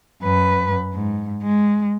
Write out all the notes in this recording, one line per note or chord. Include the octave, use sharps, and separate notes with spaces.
F#2 B4
G#2
G#3